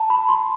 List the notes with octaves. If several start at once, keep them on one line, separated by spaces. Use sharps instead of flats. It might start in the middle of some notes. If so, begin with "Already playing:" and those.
Already playing: A5 A#5
B5
C6